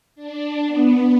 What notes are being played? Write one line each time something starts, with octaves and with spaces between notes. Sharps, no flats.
D4
B3